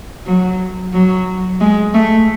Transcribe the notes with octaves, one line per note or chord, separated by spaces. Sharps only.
F#3
F#3
G#3
A3